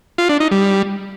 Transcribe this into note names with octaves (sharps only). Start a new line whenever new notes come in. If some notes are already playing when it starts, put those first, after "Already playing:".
F4
D4
D#4
G3